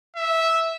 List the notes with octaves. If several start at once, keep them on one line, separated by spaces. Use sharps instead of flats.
E5